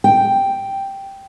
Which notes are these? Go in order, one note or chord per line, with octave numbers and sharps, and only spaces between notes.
G5